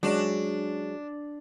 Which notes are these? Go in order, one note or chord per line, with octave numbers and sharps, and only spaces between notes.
F#3 G#3 C#4 D4